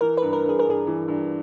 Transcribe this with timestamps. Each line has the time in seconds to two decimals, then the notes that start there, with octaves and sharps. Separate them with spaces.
0.01 E3 A#4
0.17 B4
0.22 G2
0.33 A#4
0.44 G2 G#4
0.59 A#4
0.66 G2 G#4
0.87 E3
1.08 G2